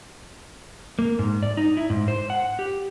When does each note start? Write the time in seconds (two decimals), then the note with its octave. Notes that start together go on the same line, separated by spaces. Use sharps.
0.99 A#3
1.19 G#2
1.43 D5
1.57 D#4
1.77 E4
1.90 G#2
2.08 C5
2.30 F#5
2.59 G4